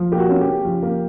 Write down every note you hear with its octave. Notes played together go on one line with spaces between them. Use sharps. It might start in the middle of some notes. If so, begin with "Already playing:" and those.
Already playing: F3
A#3 G4
F#4
C#4
G4
C#3
F3
A#3